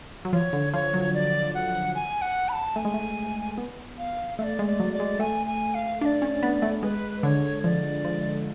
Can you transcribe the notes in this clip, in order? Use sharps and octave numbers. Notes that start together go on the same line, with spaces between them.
F#3
F3 C#5
D3
F3 C#5
F#3
D5
F#5
G#5
F#5
B5
A5
A3 G#5
G#3
A3
B3
F5
A3 F5
D5
G#3
D5
F#3
D5
G#3
A3 G#5
G#5
F5
D4 F5
D5
C#4
B3
A3
G#3 B4
D3 C#5
F3 D5
F3